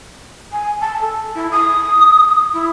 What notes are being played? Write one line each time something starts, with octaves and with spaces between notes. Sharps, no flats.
G#5
A5
A4
E4
D#6
E4